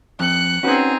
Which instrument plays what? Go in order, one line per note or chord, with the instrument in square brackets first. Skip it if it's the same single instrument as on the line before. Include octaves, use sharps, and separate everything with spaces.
[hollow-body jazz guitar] F2 [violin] F#6 C#7
[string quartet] C4 D#4 G#4 [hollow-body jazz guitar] C#4 F#4 B4